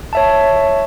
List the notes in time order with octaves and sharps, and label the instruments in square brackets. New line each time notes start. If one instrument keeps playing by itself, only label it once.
[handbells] C#5 E5 A5